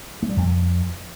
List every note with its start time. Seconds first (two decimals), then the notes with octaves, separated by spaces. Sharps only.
0.22 A3
0.30 G3
0.37 F2